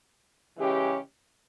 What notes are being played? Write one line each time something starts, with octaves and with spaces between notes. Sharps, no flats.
C#3 E3 G#3 C#4 G4